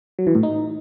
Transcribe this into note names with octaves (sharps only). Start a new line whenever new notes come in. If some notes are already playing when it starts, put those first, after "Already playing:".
F#3
E3
A2
D#4